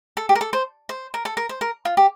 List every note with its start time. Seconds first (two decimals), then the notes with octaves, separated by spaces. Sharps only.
0.17 A4
0.29 G4
0.35 A#4
0.41 A4
0.53 C5
0.89 C5
1.14 A#4
1.25 A4
1.37 A#4
1.49 C5
1.61 A#4
1.85 F4
1.97 G4